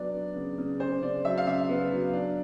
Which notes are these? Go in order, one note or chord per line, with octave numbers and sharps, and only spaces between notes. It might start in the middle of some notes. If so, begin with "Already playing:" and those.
Already playing: F#3 B3 D4 D5
B3
C#3
C#3
C#3 C5
C#3 D5
F#3 E5
F5
C#3 E5
B3
F#3
D4